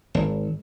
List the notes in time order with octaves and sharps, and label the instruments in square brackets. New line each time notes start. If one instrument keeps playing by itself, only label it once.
[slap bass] G#1